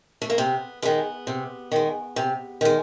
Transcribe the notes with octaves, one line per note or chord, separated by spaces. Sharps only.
A3
A#3
C3 B3
D#3 G#3 B3
C3
D#3 G#3
C3
D#3 G#3